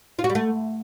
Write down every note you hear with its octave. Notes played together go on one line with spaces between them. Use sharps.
F4
F#4
G3
A3